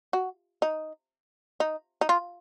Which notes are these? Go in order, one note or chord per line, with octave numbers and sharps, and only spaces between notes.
F#4
D#4
D#4
D#4
F4